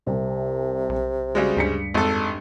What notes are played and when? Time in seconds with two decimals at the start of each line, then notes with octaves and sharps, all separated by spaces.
0.07 C2 C3
0.89 B1
1.35 C#3 G3 G#3 F#4
1.57 D2 G2 B6 C#7
1.94 G#1 F2 A4